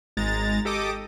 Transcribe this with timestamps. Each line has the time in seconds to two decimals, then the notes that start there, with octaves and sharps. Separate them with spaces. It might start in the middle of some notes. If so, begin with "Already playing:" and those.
0.17 G#1 G#3 A#5 A6
0.65 G4 A4 D#5 D6 D#6